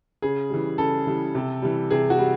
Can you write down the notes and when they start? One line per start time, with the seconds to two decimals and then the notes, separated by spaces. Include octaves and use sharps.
0.22 C#3 G#4
0.50 E3 G3
0.78 C#3 A4
1.07 E3 G3
1.35 C3
1.62 E3 G3
1.90 C3 G#4
2.10 F#4
2.19 G3